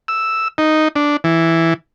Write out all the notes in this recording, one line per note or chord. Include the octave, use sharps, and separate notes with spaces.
E6
D#4
D4
E3